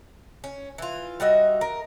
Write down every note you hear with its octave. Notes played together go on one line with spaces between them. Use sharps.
C#4
E3 F4
G3 F#4 D#5 E5
A#4